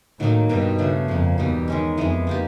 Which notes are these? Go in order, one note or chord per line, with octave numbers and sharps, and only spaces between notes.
A2 D#3 F#3 A#3 D#4
G2 B2 G3 B3 D#4
C#3 F#3 A3 D4
F2 C#3 F3 A#3
E2 B2 G3 B3 D#4
D#3 G#3 C#4
F2 E3 G#3 B3
A#3 D#4 G4